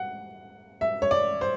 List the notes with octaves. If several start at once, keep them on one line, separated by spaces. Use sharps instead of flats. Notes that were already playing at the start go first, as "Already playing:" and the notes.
Already playing: F#5
E5
C#5
D5
C5